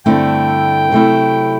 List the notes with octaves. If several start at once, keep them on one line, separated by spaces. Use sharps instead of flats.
G2 D3 A3 C4 E4 G5
C3 F#3 A3 E4